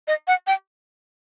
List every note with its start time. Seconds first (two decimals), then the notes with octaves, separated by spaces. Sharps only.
0.08 D#5
0.28 F#5
0.47 G5